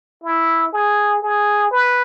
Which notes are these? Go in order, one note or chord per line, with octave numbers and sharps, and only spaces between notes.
E4
G#4
G#4
B4